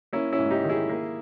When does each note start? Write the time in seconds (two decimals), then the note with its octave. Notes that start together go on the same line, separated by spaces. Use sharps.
0.13 A#3 C#4 E4
0.33 C#4 E4
0.39 G#2
0.50 D#4 G4
0.64 D#3
0.69 E4 G#4
0.89 A#3